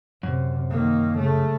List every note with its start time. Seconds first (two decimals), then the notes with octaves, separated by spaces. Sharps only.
0.23 F#2 C3
0.70 D#3 A#3
1.18 C#3 A3